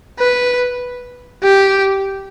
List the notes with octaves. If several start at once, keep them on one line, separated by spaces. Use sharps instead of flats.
B4
G4